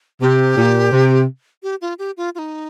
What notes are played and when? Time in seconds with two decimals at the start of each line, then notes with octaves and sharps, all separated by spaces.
0.21 C3 G4
0.57 A#2
0.92 C3
1.63 G4
1.81 F4
1.99 G4
2.17 F4
2.35 F4
2.39 D#4